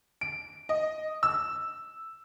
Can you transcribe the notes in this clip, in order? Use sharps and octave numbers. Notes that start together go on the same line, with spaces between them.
D7
D#5
E6